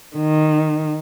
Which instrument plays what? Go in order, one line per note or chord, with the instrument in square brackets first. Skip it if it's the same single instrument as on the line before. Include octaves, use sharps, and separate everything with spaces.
[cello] D#3